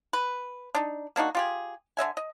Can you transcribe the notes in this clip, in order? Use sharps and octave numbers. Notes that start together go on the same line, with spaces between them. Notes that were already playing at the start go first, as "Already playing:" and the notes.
B4
D4 D#4
A#3 D4 D#4 F#4
F4 G4 G#4
D3 D#5 E5 G#5
D#5